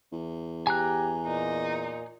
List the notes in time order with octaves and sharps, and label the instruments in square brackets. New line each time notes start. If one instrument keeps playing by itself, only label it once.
[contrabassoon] E2
[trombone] G4 [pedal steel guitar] G#5 A#5 F#6
[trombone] A#2 [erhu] D#4